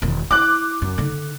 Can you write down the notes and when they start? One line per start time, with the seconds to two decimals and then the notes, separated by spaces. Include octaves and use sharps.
0.02 E1 D#3
0.31 E4 D6 F#6
0.82 F#2
0.98 D3 D#4